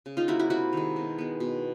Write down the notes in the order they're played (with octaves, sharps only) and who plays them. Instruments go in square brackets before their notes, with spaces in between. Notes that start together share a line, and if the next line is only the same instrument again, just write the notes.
[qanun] C#3
D#4 F4
F#3 A#3 E4 F#4
E4 F#4
C3 E4 F#4
D#3 G#3
B2
G#3 B3
B2